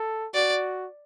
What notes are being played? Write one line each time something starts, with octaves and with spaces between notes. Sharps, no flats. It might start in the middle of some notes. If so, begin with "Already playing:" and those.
Already playing: A4
F#4 D5